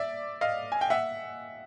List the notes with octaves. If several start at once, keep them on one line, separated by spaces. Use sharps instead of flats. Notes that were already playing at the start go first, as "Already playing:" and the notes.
Already playing: D5 E5
D#5 F5
G#5
G5
E5 F#5